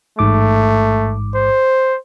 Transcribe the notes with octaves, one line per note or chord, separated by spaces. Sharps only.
A1 G#2 A3 D6
C5